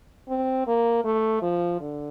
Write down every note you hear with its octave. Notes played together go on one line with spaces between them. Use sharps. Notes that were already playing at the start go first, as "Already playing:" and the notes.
C4
A#3
A3
F3
D3